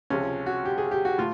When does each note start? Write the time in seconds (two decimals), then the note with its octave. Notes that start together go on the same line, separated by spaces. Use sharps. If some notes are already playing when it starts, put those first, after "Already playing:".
0.10 C#2 C3 F3 G#3 C#4
0.46 F#4
0.65 G4
0.78 G#4
0.91 G4
1.05 F#4
1.18 A2 F4